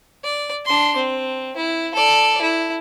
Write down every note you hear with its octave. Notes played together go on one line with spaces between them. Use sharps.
D5
D4 C6
C4
E4
A4 D5
E4